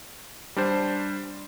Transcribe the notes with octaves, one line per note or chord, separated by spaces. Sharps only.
G3 D4 C5